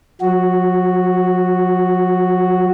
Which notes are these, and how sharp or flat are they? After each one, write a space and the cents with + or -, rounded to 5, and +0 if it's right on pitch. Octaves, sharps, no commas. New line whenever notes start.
F#3 -45 F#4 +0